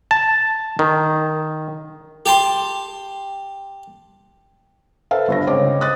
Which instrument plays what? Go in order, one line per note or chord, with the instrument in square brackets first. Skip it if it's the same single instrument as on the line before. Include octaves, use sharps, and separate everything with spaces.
[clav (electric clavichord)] A5
D#3
[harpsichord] G4 A5 C6
[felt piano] A4 B4 C5 E5 F5
G1 G2 A#6
C#2 G#3 C4 C5 C#5 D6
D#5 D#6 F#6 A6